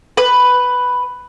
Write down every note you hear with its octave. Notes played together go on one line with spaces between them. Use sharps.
B4